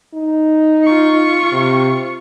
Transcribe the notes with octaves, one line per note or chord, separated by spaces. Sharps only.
D#4
F4 C#6
C3